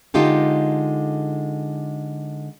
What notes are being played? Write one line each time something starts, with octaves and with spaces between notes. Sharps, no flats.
D3 G#3 D#4 F4 G4 A4